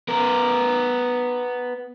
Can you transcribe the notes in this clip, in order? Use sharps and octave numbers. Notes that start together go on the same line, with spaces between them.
B3 A#4